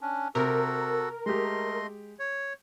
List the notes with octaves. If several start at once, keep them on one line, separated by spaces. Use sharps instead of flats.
C#4 D4
C3 F#4 A4 A#4
G#3 A3 G4 D#5 C6
C#5